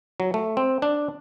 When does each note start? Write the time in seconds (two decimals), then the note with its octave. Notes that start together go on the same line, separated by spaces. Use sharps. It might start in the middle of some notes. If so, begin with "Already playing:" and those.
0.20 F#3
0.34 A3
0.57 C4
0.82 D4